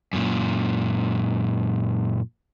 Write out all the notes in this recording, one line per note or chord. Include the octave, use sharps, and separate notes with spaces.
F#2 A#2